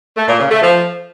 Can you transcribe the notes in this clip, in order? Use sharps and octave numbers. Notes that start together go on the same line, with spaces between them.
A3
A#2
C#3
A3
F3